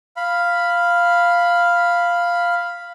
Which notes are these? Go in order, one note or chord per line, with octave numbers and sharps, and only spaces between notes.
F5 B5